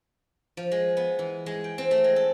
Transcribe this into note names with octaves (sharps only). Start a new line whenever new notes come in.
F3
G#3
B3
E3
G#3
G5
C4
A3
G#3
A4